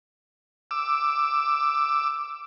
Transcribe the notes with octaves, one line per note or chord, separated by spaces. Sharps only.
D6 E6